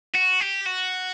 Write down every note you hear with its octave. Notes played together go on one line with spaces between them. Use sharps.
F#4
G4
F#4